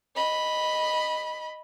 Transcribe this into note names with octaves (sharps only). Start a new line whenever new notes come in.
D#5 B5